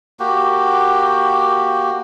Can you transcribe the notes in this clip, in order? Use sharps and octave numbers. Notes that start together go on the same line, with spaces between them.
A#3 F#4 G4